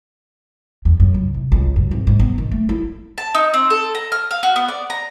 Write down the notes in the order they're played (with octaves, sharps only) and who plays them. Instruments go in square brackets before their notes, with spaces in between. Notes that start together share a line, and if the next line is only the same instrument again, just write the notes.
[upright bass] E2
F#2
C#2
C2
C#2
F#2
G#1
G#2
B3
D#3
A3
E4
[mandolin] A5
D#4
C4
A4
A#5
F6
F5
F#4
B3
D5
A#5